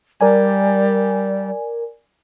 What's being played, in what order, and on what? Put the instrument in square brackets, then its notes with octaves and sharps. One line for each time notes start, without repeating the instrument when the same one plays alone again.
[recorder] G3 [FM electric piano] A#4 D5 G#5